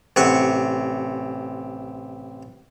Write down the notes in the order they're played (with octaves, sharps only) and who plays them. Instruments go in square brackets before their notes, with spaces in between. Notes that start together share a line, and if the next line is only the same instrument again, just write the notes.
[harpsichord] A1 C3 F#5 C#6